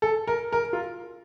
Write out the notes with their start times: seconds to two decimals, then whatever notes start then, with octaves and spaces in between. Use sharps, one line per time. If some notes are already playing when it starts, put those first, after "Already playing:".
0.02 A4
0.27 A#4
0.53 A#4
0.73 F4